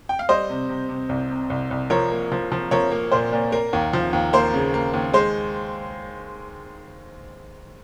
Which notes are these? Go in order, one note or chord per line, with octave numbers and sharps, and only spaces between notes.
G5
F5
G3 C5 D#5
C3
C3
C3
C2
C3
C2
C2
F3 A#4 C#5
A#3
F3
F3
F3 A#4 C#5
A#3
A#2 C5
A#2
A#3 A#4
D#2
F3
D#2
A#3 C5
C#3
A#3
D#2
G#3 C5